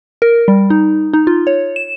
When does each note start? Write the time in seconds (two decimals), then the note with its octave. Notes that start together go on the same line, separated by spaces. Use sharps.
0.22 A#4
0.48 G3
0.70 D#4
1.13 D#4
1.27 F4
1.47 C#5
1.76 E7